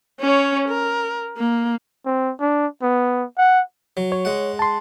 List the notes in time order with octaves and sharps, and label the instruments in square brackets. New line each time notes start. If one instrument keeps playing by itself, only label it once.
[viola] C#4 C#5
A#4
A#3
[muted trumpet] C4
D4
B3
F#5
[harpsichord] F#3
[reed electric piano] C#5
[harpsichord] G#3 F#5
[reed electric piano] A5 C6